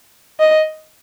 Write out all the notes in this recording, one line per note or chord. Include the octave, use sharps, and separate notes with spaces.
D#5